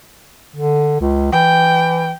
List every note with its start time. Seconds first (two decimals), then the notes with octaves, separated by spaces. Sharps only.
0.56 D3
1.01 C#2
1.33 E3 G5